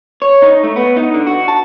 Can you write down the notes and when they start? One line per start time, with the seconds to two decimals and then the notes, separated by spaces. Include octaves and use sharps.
0.22 C#5
0.42 D#4
0.64 A3
0.76 B3
0.96 D#4
1.14 D3
1.27 F#4
1.48 A5